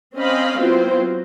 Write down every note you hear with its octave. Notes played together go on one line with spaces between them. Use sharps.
C4 C#4 C5 D#5 F5 B5
F#3 B3 C4 E4 F4 C5
F#3